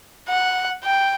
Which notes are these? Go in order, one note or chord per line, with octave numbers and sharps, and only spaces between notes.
F#5
G5